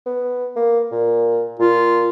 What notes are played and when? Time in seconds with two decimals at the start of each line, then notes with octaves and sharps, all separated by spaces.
0.06 B3
0.56 A#3
0.92 A#2
1.59 A#2 F4